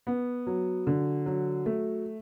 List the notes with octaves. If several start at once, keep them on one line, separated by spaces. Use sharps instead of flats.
B3
F#3
D3
F#3
A3